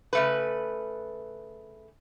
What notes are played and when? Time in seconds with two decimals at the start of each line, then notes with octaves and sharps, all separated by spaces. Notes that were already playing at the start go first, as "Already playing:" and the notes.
0.13 C#3 A3 B4